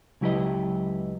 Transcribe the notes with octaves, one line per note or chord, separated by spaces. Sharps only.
C#2 F#3 E4 G4 B4 D#5